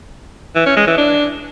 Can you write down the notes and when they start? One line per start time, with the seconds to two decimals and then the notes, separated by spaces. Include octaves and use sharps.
0.56 E3
0.66 C#4
0.77 G#3
0.87 E3
0.98 D4